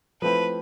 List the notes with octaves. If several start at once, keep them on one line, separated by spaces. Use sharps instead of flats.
F3 A3 C4 E4 B4